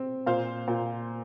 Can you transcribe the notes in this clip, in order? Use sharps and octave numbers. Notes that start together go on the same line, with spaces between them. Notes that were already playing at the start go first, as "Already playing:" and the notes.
Already playing: C4
A#2 C5 F5
A#2